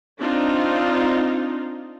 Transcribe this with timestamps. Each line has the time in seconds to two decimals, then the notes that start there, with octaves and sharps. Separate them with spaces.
0.19 C4 D4 D#4 F4